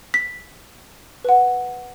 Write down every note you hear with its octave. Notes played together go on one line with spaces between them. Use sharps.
B6
B4 F#5